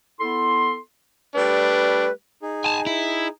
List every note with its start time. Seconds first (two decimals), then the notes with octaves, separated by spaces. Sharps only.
0.20 B3 E4 A4 C6
1.34 G3 A3 D4 B4
2.42 D#4 G#4
2.65 G#5 A5
2.86 E4